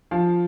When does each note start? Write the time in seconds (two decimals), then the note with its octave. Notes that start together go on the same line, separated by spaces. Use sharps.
0.11 F3 F5